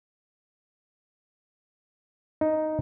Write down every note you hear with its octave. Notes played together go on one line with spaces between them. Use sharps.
D#4